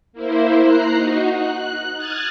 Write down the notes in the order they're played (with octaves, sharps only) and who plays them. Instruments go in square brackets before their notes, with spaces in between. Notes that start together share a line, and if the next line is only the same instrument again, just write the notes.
[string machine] A#3 E4 C5
A#5 F#6 C7
D#4 F#4
F#6
D#6 F6 F#6 G#6 A6